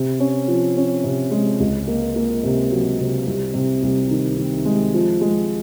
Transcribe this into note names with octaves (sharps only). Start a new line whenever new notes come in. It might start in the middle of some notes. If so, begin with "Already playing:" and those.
Already playing: C3
C#4
F3
C#4
C3
G#3
C#2
A#3
A#3
C3
F#3
C3
C2
C3
C2
D#3
D#3
G#3
F3
G#3